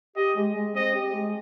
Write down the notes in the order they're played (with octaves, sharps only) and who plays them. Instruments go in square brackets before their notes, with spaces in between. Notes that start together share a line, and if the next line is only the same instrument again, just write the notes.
[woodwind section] G4 [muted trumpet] D#5
[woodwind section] G#3
G#3
[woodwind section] C4 [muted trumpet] D#5
[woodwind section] G4
G#3